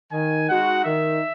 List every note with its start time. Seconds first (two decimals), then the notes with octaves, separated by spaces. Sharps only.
0.11 D#3 G#5
0.48 G#3 D#4 F#4 F#5
0.84 D#3 E5